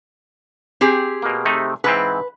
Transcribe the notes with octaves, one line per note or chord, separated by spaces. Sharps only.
C4 G4 G#4
B2 A#3
C3 A3 D#4
G#2 E3 C4 B4